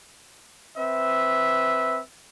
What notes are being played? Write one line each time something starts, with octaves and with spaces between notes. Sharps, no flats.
C4 B4 E5